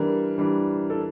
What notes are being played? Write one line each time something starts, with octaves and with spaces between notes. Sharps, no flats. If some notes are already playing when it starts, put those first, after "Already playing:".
Already playing: E3 G3 D4 A#4
E3 G3 D4
A4